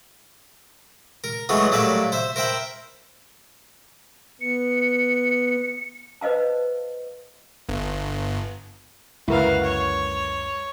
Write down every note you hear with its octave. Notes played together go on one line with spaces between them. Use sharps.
A#4
E3 F#3 G#3 A3 B3 F#4
A2 F#3 G3 A#3 E5 D6
C5 E5
A#4 C5 E5 G5 B5
B3 C#7
B4 C5 D#5 F5 A5
G1
C#2 F#2 D3 E4 F#4 A#4 B4 F5
C#5